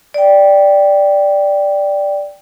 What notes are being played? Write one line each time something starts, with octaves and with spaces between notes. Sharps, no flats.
D5 G5